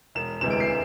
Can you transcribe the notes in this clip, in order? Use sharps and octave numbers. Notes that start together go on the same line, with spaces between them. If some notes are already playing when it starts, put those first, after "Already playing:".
E1 E7
D2 C3 E3 G#3 E7
D7
C7